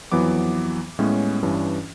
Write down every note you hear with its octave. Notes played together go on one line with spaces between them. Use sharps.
F2 E3 F#3 B3 D6
A2 G3 G#3 B3 C#4
G2 E3 C#4 D4